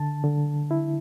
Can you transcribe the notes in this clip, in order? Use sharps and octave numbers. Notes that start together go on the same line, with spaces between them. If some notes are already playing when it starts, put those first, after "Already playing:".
Already playing: D3 A5
D3
E4